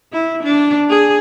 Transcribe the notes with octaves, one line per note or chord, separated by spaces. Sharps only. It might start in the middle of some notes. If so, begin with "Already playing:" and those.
E4
D4
G#4